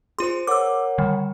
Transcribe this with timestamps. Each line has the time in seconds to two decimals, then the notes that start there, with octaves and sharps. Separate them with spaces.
0.19 F4 G#4 C5 C6
0.47 A#4 C#5 F#5 D6 E6
0.98 D3 D#3 G3